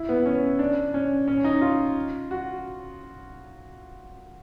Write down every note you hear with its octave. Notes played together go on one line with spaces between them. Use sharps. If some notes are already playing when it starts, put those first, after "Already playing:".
Already playing: E4
B3
C#4
D4
C#4
C#4
D#4
F4
F#4